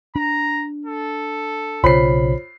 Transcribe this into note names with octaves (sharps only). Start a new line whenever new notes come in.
D4 A#5
A4
B1 C#3 F4 C5 C#5 B5 C7